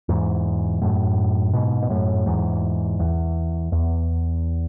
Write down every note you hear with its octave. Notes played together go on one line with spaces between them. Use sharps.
E2 G#2
F#2 A2
G#2 B2
B2
F#2 A2
E2 G#2
E2
E2